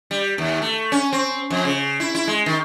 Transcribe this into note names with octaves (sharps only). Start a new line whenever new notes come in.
G3
D#2
A3
C#4
C4
F2
C#3
E4
E4
G#3
D#3